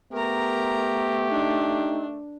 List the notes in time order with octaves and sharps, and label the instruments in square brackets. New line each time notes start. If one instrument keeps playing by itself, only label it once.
[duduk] A3 [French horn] B3 [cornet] G4 [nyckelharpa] A#4 A#5
[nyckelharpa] D4 [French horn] D#4